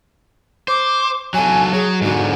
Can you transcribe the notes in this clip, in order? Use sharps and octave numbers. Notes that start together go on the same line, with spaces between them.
C5 D6
F#3 A4 G#5
F#3 G#4
G#2 D3 F#4